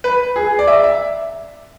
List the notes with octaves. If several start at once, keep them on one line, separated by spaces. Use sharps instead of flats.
B4
G#4
D5
E5
E5